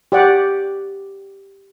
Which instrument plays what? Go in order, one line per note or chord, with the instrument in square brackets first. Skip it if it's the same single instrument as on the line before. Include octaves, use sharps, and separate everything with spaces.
[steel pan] G4 D5 F#5